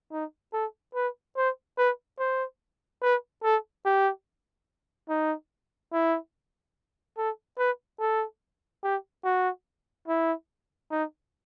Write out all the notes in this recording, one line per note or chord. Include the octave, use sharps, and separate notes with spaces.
D#4
A4
B4
C5
B4
C5
B4
A4
G4
D#4
E4
A4
B4
A4
G4
F#4
E4
D#4